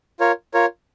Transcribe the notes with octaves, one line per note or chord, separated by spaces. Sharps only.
F4 A#4 C#5
F4 A#4 C#5